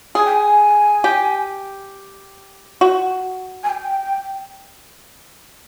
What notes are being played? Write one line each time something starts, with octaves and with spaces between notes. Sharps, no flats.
G#4 G#5
G5
G#5
G4
F#4
G#5
G5